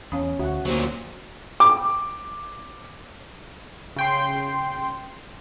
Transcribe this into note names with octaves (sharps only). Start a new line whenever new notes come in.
E2 C#4 C#5 F5 B5 D#6
D2 F#4 E5 F#5
D2 A#2 F#3 A#3 G4 C5
D6
C#3 G5 C6